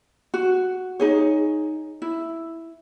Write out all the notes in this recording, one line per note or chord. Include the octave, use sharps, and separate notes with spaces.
F#4
D#4 G#4 C#5
E4